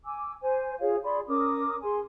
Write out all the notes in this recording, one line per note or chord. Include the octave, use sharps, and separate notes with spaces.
G#5 D6 E6
C5 G#5
F4 G#4 C#5 F5
G#4 D5 B5 C6
C#4 A#4 D6 D#6
G#4 G#5 C6